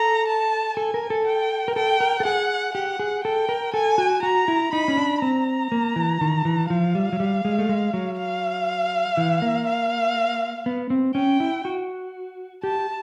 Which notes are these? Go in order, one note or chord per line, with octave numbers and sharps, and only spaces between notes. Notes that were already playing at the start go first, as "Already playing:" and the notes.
Already playing: A4 A#5
A5
A4 G#5
A#4
A4
G5
A#4
A4 G5
A#4
A4
G#4 F#5
G4 F#5
G#4
A4 G5
A#4
A4 G#5
F#4
F#4 A#5
E4
D#4 B5
C#4
D4
C4 A#5
A#3
E3
D#3
E3
F3 F5
G3
F#3
G3
G#3
A3
G#3
F#3
F5
E3
A#3
F5
B3
C4
C#4 G5
E4
F#4
G4 A5